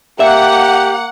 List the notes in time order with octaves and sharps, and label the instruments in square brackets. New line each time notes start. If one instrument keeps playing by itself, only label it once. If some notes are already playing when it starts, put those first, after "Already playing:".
[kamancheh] A#3 [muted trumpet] G4 [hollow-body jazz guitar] E5 [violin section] F#5